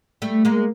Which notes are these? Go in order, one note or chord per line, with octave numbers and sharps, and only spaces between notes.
G3 A3
G#3 A#3